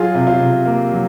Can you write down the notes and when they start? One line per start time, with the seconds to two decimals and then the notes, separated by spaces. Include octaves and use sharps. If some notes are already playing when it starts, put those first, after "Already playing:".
Already playing: F#3 F4 G#4
0.15 C3
0.27 F4
0.40 C3
0.66 A#3
0.92 F#3